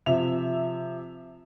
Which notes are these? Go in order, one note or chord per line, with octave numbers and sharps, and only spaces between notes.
C3 F3 E5 F7